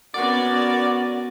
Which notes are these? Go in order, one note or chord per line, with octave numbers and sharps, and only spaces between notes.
B3 C#4 F#4 A#4 D5 F#5